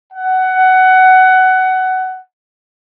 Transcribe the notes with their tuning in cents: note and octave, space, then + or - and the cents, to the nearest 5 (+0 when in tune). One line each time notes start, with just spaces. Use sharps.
F#5 +15